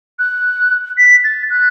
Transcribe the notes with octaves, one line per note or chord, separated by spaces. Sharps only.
F#6
B6
A6
F#6